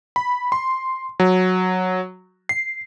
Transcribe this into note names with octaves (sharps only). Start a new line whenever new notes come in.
B5
C6
F#3
C7